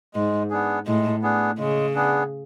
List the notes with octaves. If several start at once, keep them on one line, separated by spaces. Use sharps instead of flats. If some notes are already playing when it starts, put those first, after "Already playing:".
G#2 G#3
B3 D4 G#4
A2 G#3
B3 D4 G#4
C#3 G#3
B3 D4 G#4